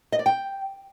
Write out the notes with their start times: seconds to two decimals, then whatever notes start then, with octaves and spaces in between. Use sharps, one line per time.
0.12 D#5
0.19 D5
0.26 G5